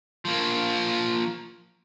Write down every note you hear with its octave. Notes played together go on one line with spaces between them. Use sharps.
F3 A#3